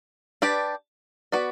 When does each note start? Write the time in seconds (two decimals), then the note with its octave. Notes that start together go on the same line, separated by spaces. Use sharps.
0.42 D4 G4 B4 D5
1.32 B3 F#4 B4 D5